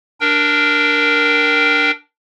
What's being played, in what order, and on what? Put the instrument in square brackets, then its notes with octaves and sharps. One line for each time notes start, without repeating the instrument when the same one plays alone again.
[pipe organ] D4 A#4 G5